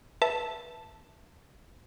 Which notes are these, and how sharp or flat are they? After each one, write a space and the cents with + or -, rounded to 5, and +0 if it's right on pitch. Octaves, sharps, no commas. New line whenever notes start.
B4 -20 E5 +0 A5 +0